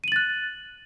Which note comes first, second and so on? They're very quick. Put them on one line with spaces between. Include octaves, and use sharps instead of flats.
D#7 F#7 A6 F#6